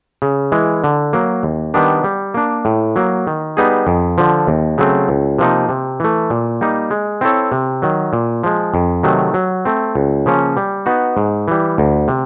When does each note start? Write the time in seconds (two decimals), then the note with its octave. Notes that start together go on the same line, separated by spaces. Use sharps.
0.22 C#3
0.52 E3 G#3
0.84 D3
1.13 F#3 A#3
1.43 D#2
1.74 D#3 G3 B3 D4
2.04 G3
2.34 A#3 D4
2.65 A2
2.96 F#3 A#3
3.27 D#3
3.57 G3 B3 D#4 G#4
3.87 F2
4.18 D3 F3
4.47 D#2
4.78 C#3 F#3 A3 C4
5.09 C#2
5.39 C3 F3 A#3 D#4
5.69 C3
6.00 E3 A3
6.30 A#2
6.61 G3 A#3 D#4
6.91 G#3
7.21 C4 E4 A4 C#5
7.52 C3
7.82 D#3 F#3
8.13 A#2
8.44 F3 G#3
8.74 F2
9.03 C3 D#3 F#3 A3
9.34 F#3
9.65 A3 C4
9.95 C#2
10.26 C#3 F3 A#3 C#4
10.57 G3
10.86 B3 D#4 F#4
11.17 G#2
11.48 E3 G3
11.78 D2
12.08 C3